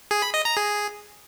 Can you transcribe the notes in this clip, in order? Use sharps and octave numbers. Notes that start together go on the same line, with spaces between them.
G#4
B5
D#5
A#5
G#4